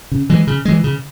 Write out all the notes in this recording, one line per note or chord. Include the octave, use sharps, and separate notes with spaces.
C#3
E3 G#3
C#3
E3 G#3
C#3